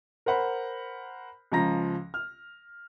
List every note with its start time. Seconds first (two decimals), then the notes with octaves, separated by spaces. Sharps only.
0.26 A#4 C5 F#5 B5
1.51 C#2 C#3 F3 A#5 A#6
2.14 F6